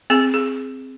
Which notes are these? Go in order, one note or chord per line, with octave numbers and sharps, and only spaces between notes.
C4 G#4
G#4